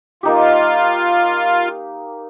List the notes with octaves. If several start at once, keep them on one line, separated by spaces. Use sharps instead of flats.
A#3 D#4 F4 G4